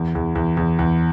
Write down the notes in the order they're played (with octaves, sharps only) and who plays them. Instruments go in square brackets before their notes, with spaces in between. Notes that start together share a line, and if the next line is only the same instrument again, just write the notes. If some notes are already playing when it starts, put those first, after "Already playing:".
Already playing: [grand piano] E2
E2
E2
E2
E2